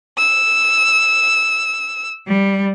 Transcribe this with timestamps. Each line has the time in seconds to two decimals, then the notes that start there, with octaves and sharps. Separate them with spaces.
0.17 E6
2.26 G3